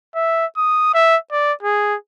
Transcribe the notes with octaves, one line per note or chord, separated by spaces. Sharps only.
E5
D#6
E5
D5
G#4